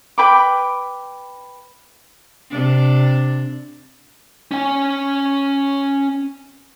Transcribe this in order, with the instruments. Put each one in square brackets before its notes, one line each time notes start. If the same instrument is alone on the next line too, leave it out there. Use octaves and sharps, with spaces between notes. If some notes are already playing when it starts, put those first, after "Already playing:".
[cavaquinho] B4 G5 B5 D6
[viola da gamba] C3 D4
[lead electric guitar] C#4 G#5